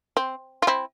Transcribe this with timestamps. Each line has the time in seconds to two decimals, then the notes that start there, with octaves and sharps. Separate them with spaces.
0.17 C4
0.62 F4
0.67 C4 E4